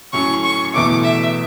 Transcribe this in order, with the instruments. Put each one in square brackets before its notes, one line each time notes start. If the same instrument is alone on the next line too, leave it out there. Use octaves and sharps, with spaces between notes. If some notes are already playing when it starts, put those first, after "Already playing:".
[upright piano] A2 F#3 C#4 [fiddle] C#6
[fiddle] C#6
[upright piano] E2 B2 A3 E4 [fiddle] D6
[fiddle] E5